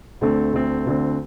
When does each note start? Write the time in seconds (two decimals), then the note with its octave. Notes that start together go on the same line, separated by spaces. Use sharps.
0.21 D2 D3 A3 C4
0.53 D2 D3 A3 C4
0.86 D2 D3 A3 C4